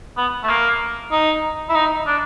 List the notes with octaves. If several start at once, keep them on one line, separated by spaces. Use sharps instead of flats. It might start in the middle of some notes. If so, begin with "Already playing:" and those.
B3
A3
A#3
D#4
E4
D#4
D4